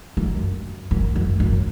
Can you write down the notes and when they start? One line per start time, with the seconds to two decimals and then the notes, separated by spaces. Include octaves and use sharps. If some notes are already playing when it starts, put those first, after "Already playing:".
0.17 F#2
0.91 F#2
1.16 F#2
1.40 F#2